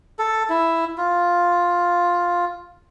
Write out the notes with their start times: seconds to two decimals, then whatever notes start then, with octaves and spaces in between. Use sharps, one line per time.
0.19 A4
0.49 E4
0.98 F4